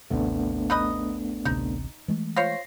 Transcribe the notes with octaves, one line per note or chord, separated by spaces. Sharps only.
A1 D#2 C3 A3 B3 D4
D#4 B4 D#5
A1 D2 C3 D#4
E3 G#3 A3
F4 C5 C#5 A#6 C7